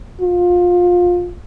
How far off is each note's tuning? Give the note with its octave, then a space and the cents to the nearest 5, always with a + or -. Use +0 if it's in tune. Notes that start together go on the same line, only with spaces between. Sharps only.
F4 +20